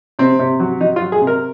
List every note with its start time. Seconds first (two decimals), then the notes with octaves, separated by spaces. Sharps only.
0.19 C3 C4
0.39 C3
0.60 F#3
0.81 F#3 D#4
0.96 F4
1.01 F#3
1.12 G#4
1.21 C3
1.27 A#4